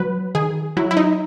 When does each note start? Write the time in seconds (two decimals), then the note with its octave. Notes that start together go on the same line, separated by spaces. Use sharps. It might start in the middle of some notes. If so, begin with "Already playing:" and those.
Already playing: F#3 B4
0.35 D#3 G#4
0.77 F#3 E4
0.91 E4
0.97 D#4